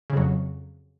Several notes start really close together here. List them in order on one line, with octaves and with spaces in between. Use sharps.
C#3 F2 F#3